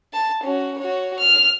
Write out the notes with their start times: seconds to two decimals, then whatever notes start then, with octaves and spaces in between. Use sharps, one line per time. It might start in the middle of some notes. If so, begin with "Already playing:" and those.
0.13 A5
0.43 C#4 F#4
0.78 F#4 C#5
1.19 F6